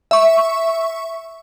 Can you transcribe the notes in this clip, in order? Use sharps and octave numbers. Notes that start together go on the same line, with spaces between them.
E5 C#6